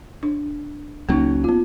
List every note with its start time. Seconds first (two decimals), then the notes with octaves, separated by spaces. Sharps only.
0.23 D4
1.09 C#2 F#3 A#3 C#4 D#4
1.44 B3 F4